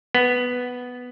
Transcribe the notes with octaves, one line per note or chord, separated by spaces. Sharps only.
B3